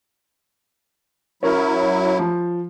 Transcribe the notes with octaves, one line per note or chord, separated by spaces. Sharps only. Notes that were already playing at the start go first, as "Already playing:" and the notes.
F#3 C#4 E4 A#4
F3